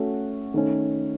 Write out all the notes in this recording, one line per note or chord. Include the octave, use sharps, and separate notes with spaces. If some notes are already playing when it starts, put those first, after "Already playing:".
Already playing: A3 C#4 F#4 A4
D#3 A3 C#4